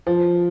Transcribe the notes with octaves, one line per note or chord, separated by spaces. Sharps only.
F3